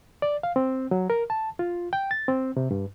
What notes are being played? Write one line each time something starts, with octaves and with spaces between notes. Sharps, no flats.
D5
F5
C4
F#3
A#4
A5
F4
G5
A6
C4
C3
G2